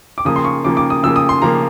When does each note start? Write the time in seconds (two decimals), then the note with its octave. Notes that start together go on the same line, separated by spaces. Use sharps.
0.18 D6
0.25 C#3 F3 A#3 D#6
0.36 C6
0.45 C#6
0.64 C#3 F3 A#3 D6
0.77 D6
0.90 D#6
1.03 C#3 F3 A#3 E6
1.16 D#6
1.29 C6
1.42 C#3 F3 A#3 A#5